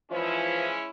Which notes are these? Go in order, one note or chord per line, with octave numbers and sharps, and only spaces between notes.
E3 F3 G#3 C#4 E4